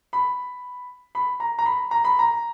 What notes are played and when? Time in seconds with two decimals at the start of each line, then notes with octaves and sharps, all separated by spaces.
0.13 B5
1.15 B5
1.40 A#5
1.59 A#5
1.66 B5
1.91 A#5
2.04 B5
2.19 A#5